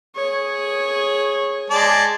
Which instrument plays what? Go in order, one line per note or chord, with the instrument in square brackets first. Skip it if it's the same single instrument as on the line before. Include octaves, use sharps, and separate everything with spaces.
[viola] G#4 C#5
[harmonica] G#3 D5 A5